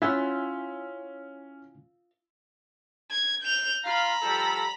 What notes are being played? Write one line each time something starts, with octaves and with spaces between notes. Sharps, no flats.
C#4 E4 F4 F#5 G#5 E6 B6
G#6
G6 F7
F4 F5 A#5 B5
F3 G3 A4